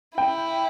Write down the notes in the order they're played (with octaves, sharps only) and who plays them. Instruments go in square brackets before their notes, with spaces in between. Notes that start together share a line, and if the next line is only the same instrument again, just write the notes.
[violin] E4 [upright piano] G5